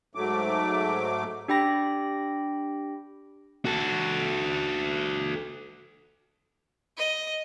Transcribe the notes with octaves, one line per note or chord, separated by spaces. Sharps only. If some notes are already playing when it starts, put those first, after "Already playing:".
G#2 F#3 A3 D6
D4 G4 G5 B5 A#6
F#4 A4
D#5